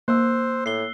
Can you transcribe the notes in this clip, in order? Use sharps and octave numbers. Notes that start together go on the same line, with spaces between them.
A#3 C5 E6 F#6
A2 C7 G7